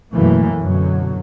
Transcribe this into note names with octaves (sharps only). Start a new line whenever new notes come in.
F#2 B2 E3 A3 A#3
F#2 B2 D3 F#3